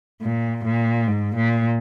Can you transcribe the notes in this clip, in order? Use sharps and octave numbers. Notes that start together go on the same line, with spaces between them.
A#2
A#2
G#2
A#2